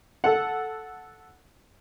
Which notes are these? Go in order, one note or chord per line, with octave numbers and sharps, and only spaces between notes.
A4 F#5